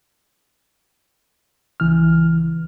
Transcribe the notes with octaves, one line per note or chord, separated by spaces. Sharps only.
C#2 E3 F6